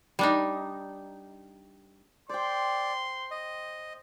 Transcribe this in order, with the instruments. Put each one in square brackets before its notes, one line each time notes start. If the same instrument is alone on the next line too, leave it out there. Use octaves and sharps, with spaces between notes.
[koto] G3 D4 D#4
[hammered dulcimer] C5 G5 [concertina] D5 [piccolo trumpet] C6
[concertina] D#5